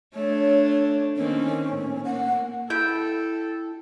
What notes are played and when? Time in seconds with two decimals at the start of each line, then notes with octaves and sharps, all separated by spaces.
0.15 A3 D4 C#5
1.17 D#3 A#3 C4 C#4
1.69 A2
2.05 A#3 F#5
2.70 E4 A4 G5